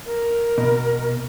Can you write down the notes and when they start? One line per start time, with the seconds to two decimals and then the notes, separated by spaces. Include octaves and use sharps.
0.06 A#4
0.58 B2